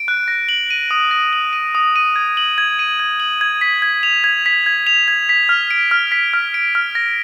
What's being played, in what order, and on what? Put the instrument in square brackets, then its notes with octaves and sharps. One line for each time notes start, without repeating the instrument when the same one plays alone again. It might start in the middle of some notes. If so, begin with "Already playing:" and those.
Already playing: [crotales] D7
F#6
A#6
F#7
D#7
D#6
A#6
F#7
D#7
D#6
D#7
G#6
F#7
G#6
D#7
G#6
F#7
G#6
B6
G#6
F7
G#6
B6
G#6
F7
G#6
B6
F6
D7
F6
B6
F6
D7
F6
A#6